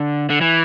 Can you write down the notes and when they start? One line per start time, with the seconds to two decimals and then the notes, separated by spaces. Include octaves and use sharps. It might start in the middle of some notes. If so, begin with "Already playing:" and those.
Already playing: D3
0.30 D3
0.41 E3